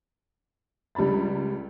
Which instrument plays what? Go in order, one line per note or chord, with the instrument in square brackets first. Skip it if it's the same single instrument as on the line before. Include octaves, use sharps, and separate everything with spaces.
[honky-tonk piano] C#2 G3 A#5 B5 A6